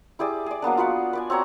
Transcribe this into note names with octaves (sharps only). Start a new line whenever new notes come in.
E4 G4 G#4 D5
G#4 D5
F#3 A#3 B3 D4
F4 F#4 B4 F#5
B4 D5 G#5
C4 F#4 C#5 A#5